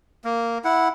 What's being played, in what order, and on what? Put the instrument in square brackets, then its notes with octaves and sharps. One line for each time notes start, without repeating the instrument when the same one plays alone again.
[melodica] A#3
E4 F#5